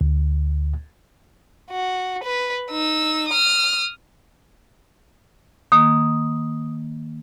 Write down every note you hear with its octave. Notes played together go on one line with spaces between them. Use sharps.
D2
F#4
B4
D#4 E6
D#6 F6
D#3 A#3 D#6